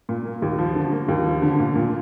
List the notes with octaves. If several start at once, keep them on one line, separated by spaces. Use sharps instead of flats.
A#2
A#3
D#2
F3
D3
A#3
D#2
F3
D3
A#2
A#2